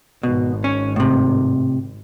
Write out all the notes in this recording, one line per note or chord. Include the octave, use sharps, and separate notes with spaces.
G#1 B2
C#4
A2 C3